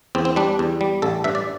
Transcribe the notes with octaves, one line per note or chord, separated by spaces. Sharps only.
E2 C4
C4
G3 D4
E2
G3
A1 A4
G2 E5
D5